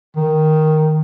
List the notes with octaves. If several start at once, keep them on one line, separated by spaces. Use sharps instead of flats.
D#3